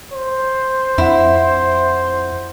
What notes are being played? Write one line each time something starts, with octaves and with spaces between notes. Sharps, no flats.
C5
F2 E4 E5 F#5